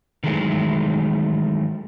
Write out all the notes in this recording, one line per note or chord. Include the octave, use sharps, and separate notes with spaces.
D#3 E3 F#3 G#3 A3